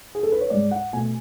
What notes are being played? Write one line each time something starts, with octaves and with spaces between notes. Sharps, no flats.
G#4
A4
B4
C#5
G#2 G#3 D5
F#5
B2 A3 G#5